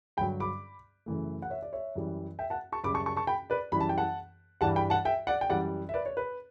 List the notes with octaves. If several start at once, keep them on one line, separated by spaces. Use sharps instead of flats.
G2 D3 F#3 G5 B5
B5 D6
F#2 C#3 E3 A3
F#5
C#5 E5
D5
C#5 E5
F#2 E3 G3
E5 G5
F#5 A5
A5 C#6
F#2 C#3 G3 B5 D6
A5 C#6
A5 C#6
A5 C#6
G5 B5
B4 D5
F#2 E3 G3 B5
A5
G5
F#5 A5
G2 E3 G3 F#5 A5
G5 B5
F#5 A5
E5 G5
D5 F#5
G5
F#2 E3 G3 D5 F#5
E5
B4 D5
C#5
B4